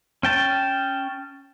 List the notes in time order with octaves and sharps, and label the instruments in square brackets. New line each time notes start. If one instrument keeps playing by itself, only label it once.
[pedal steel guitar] C#4 G5 A5